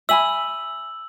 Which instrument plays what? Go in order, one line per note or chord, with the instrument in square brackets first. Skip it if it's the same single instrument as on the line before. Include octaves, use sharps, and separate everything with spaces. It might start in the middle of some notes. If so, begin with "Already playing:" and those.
[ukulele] E5 G#5 B5 [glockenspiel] E6 F#7